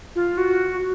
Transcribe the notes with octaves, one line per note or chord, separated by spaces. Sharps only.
F4
F#4